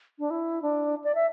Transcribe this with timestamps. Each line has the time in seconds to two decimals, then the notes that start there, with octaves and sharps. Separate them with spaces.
0.19 D4
0.30 E4
0.62 D4
1.04 D5
1.15 E5